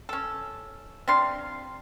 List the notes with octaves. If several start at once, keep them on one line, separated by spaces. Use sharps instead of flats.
C#4 A4
C3 D4 F5 C6